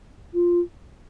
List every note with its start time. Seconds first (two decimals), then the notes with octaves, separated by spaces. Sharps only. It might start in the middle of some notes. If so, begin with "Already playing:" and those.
0.33 F4